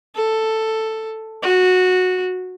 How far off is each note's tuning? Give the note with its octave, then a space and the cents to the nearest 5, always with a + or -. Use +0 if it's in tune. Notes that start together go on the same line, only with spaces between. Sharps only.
A4 +5
F#4 -10